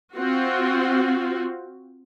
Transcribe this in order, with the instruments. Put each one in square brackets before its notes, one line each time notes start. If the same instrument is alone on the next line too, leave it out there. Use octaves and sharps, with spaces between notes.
[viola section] C4 F4 F#4